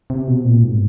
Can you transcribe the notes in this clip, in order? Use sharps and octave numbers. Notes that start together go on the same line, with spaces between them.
C3
B2
A#2
G#2